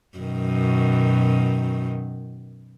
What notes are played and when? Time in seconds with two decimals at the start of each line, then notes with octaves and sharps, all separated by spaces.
0.18 F#2 B2 D#3